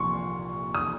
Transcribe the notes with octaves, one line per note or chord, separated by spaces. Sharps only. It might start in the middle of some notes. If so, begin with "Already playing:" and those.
Already playing: C2 A#2 F3 C6 C#6
D#6